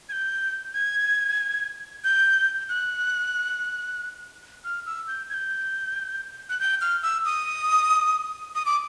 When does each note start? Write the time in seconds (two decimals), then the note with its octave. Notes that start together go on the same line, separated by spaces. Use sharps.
0.09 G#6
0.12 G6
0.74 G#6
2.04 G6
2.69 F#6
4.65 F6
4.86 E6
5.08 G6
5.30 G#6
5.34 G6
6.49 F#6
6.60 G6
6.81 F6
7.03 E6
7.25 D#6
8.55 D#6
8.66 D6